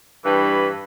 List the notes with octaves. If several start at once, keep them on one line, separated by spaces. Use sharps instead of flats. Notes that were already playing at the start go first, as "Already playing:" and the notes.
G2 E3 B4